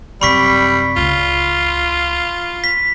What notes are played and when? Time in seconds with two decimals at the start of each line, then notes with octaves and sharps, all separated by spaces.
0.22 F#2 C3 G3 B5 C#6 B6
0.96 C#2 F4
2.64 B6